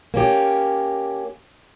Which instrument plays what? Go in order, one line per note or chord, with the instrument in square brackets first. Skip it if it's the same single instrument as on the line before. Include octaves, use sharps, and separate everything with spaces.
[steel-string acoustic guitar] A#3 C#4 G4